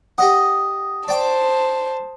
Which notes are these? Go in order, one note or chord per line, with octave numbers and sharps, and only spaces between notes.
G4 D#5 F#5 D#6
C5 D5 G5 A5 D6